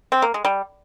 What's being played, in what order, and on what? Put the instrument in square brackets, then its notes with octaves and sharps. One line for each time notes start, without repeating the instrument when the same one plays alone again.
[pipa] C4
A#3
G#3
G3